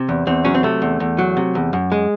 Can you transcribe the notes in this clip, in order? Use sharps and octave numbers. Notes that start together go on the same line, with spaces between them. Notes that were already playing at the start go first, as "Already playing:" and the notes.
Already playing: C3
E2
E2 C4
F#3 C#4
C4
C3 A3
E2
E2
F#3
C3
E2
F#2
G#3